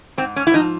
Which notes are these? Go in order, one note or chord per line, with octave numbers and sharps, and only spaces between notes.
G#2 C4
C#4
E4
F3 D#4